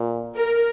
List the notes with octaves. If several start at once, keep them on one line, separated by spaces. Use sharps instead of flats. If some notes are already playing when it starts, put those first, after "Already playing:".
Already playing: A#2
A#4